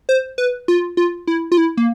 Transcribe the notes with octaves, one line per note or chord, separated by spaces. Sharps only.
C5
B4
F4
F4
E4
F4
E4
A#3